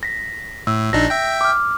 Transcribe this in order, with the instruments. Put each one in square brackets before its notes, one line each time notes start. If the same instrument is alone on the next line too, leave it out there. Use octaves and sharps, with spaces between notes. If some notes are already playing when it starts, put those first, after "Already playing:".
[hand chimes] A#6 B6
[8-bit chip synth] A2 [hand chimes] E6
[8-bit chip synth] A#1 D4 D#4 [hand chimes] A#6
[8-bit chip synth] E5 G5
[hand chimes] D6 F6